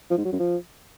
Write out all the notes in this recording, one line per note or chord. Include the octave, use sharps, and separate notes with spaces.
F3
G#2
F#3
F#2
F3